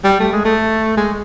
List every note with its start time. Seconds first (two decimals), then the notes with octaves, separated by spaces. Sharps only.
0.04 G3
0.20 A3
0.33 G#3
0.45 A3
0.97 G#3